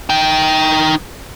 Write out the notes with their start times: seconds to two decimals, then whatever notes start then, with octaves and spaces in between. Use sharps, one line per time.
0.10 D#4 G5